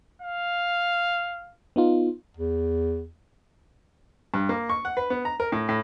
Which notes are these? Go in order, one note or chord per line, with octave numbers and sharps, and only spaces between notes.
F5
B3 D#4 F4
E2
G2
A#3
C#6
F#5
B4
B3
A#5
A#4
A2
A2